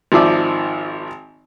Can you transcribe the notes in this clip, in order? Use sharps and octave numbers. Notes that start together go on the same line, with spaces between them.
G#1 D#3 F3 D5 E5